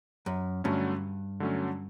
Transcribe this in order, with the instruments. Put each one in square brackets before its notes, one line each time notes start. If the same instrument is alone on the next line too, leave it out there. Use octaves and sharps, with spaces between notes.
[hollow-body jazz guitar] F#2
[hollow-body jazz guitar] G2 [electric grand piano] D3 F#3 A3 C#4
[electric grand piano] D3 F#3 A3 C#4